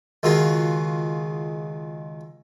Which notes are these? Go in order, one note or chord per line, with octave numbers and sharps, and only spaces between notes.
C#2 D#3 F4 F#4 G#4